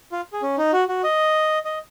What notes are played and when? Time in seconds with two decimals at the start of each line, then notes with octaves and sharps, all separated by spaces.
0.12 F4
0.33 G#4
0.42 C#4
0.58 D#4
0.73 F#4
0.88 F#4
1.04 D#5
1.65 D#5